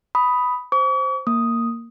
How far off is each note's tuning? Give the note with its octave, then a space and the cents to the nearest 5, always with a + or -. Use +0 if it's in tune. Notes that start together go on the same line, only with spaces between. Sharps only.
B5 +0 D#6 +5
C5 +0 C#6 +45
A#3 -10 D#6 +0